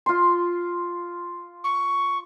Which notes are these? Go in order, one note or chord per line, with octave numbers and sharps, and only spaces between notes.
F4 C6
C#6